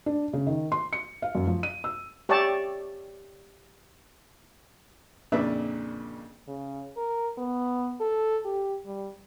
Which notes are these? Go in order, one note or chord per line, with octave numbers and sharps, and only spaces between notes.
D4
C#3
D#3
C6
C#7
F5
F#2
F3
D#7
E6
G4 C#5 D5 E5 A5
F2 A#2 C#3 D4 B4 E5
C#3
A#4
B3
A4
G4
G3